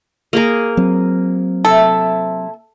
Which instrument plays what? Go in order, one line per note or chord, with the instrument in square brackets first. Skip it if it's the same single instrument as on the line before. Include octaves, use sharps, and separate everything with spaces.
[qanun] A#3 G#4 A#4
[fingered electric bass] F#3 C4
[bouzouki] C3 E4 [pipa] A4